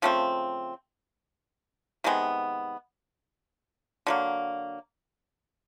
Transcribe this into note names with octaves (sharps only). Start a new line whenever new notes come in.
C#3 F3 A3 C4
C3 D#3 G#3 B3
D3 F#3 A#3